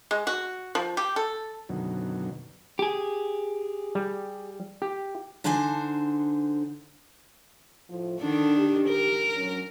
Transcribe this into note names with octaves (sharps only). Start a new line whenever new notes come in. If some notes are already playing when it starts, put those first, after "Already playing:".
G#3
F#4
F3
G4
A4
F#2 B2 D3 D#3 F#3
G4 G#4
G3
G4
D3 D4 D#4 C5 G#5 A5
A2 F3
D3 D#3 D4
G4
A#4
F#3 C#4